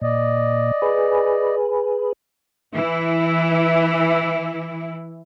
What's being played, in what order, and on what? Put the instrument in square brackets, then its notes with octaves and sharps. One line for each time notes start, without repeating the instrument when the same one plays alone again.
[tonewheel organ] A#2 [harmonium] D5 D#5
[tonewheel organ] G#4 B4
[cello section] E3 E4